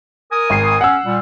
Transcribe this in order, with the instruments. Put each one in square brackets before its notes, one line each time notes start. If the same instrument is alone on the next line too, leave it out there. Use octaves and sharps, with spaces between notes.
[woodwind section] A#4 G#5 D#6
[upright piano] G#1 C7
[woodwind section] C#4 [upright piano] F#5 E6
[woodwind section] A#2 G3